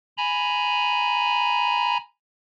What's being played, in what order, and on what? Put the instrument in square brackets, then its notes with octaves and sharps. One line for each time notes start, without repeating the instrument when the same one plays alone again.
[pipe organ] G#5 A#5 B5